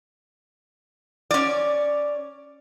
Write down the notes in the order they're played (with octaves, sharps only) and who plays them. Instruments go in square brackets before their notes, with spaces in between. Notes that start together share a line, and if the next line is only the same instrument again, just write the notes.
[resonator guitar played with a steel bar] C#4 D5